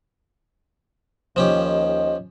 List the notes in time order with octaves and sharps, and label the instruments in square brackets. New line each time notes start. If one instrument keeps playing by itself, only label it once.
[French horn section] D#2 D#5 [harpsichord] F3 C#4 G4